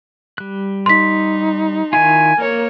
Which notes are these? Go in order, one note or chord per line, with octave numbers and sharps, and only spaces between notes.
G3 F#6
D#4 C6 B6
D#3 E4 F4 G#5
A#3 A#4 C#5